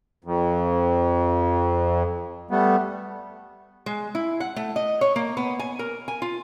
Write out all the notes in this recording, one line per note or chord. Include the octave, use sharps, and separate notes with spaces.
F2
G3 A3 B3
G#3
E4
F#5
A3
D#5
C#5
A#3
B3
G#5
A#4
G#5
F4